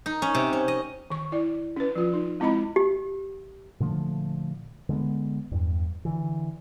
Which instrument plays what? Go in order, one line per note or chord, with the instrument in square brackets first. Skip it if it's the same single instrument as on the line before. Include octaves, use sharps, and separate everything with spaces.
[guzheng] D#4
C#4
C3
C#4
D#5
[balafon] D#3 C#6
E4 D5
C#4 B4
F3 F4
D#4
G#3 C4 E4 D#5 A#5 B5
[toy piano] G4
[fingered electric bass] A#2 D3 F3 A3
D3 G#3 A#3 B3
E2 G2
D3 E3